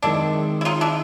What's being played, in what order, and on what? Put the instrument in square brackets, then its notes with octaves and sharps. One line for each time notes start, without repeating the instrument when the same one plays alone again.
[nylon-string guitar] D#3 G#3 C4 [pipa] D4 E4
[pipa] E4
D#4 F4
D4 E4